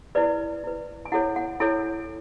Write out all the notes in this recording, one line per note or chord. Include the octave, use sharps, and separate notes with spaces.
E4 B4 D5
E4 B4
G#5
E4 A4 C#5 F#5
F#5
E4 A4 C#5 G#5